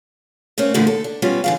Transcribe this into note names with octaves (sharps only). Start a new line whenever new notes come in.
A3 A#3 C4 C#4
A#2 D3 E3 A3 D#4
A4
D4
G3 B3 C#4 F4
D3 E3 F5